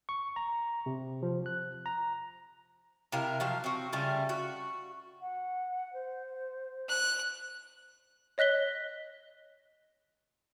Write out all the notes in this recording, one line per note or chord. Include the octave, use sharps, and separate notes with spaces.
C#6
A#5
C3
F3
F#6
A#5
C3 E4 A#4 F5
F3 F#3 F5
C4 F#4
C#3 G3 A3 F4
F#4
F#5
C5
F#6
C#5 D#5 F#6 B6 G7